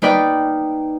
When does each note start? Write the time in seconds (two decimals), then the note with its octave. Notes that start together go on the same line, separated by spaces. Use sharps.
0.02 A#3 D#4 B4 D5 G5